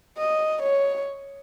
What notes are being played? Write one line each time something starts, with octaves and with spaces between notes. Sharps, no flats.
D#5
C#5